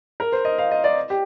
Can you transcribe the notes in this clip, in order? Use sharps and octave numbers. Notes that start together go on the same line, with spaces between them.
A#4
C5
D#5
F5
D#5
D5
G4